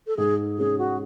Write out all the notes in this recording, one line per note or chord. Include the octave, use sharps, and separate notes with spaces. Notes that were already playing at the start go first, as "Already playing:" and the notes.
A4
G#2 G#4
G#3 C#4 G#4
F#4